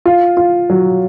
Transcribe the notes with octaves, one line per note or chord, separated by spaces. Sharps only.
F4
F4
F#3